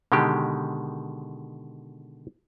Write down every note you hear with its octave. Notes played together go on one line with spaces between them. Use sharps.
B2 D3 D#3 G#3 G4